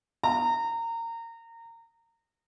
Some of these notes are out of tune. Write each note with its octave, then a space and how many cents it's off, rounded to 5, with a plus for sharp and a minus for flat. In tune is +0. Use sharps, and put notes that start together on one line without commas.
A#5 -25